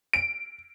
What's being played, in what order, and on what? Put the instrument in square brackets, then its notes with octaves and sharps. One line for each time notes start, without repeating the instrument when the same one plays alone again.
[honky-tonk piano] D7